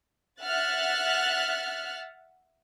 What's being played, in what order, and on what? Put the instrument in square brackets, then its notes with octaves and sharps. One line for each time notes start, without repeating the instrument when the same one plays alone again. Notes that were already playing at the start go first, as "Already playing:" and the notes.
[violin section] E5 F#5 F6 F#6 A6